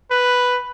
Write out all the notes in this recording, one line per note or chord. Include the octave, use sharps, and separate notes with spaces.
B4